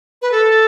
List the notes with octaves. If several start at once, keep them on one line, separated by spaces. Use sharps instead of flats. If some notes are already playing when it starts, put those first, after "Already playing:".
B4
A4